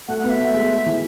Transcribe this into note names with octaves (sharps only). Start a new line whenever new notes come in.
A3 F#5
F#5
B3
E5
A3
G#3
E3